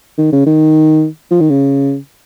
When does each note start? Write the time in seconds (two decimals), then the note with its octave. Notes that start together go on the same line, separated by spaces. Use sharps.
0.18 D#3
0.33 C#3
0.46 D#3
1.31 F3
1.41 D#3
1.50 C#3